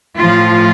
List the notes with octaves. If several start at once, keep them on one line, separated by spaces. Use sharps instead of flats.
A2 F3 F4